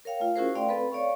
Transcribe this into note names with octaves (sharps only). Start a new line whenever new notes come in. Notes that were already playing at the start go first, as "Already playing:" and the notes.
A#4 C#5 F5 G5
A3 F4 F5
C#4 E4 F#4 G#4 A#4 C5
A3 D5 F5 G5 C6
C4 A4 B4 B5
C#5 D5 F5 C#6